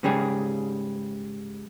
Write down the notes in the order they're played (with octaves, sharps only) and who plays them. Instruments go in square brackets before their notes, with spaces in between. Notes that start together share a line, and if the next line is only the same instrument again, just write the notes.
[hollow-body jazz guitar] G#2 C#3 G3 G#4